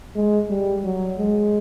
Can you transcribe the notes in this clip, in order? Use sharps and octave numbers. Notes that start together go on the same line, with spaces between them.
G#3
G3
F#3
G#3